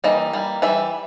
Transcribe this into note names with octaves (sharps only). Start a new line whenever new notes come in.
E3 G3 A#3 D#5
E3 G3 A#3
E3 G3 E5